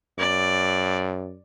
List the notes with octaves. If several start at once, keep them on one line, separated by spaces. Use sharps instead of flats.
F#2 D5